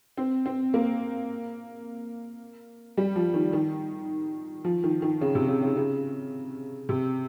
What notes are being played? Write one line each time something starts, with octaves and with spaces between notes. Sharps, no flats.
C4
C4
A#3
G3
F3
D#3
D#3
F3
D#3
D#3
C#3
C3
C#3
C#3
C#3
C3